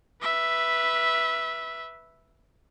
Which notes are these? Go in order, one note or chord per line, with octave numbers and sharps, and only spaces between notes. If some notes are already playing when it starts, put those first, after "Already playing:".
B4 E5